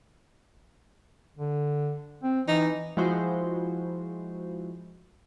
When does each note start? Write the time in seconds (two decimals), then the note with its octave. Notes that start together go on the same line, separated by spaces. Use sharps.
1.37 D3
2.23 C4
2.48 E3 D#4
2.97 F3 G#3 E4 F#4 C5